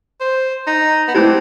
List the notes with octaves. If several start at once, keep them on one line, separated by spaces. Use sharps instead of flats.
C5
D#4
B3
A3 C4 E4 G4